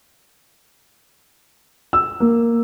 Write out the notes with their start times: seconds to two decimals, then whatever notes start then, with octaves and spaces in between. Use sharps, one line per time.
1.93 E6
2.20 A#3